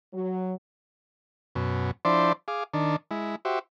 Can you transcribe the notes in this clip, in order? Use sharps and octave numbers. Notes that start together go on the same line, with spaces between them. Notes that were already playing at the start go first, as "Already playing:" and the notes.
F#3
F#2 B2
F3 D4 E4 C5 D5 C6
G#4 F5 D6
D#3 D4
G#3 E4
F#4 G4 C5 E5